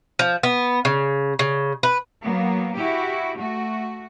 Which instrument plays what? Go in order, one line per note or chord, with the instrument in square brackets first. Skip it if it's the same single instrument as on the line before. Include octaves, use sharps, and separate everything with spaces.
[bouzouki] F3
B3
C#3
C#3
B4
[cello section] F#3 A#3 B3
E4 F#4 G4
A3 F#4